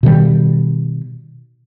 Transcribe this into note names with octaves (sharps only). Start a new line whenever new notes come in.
B2 D#3 G3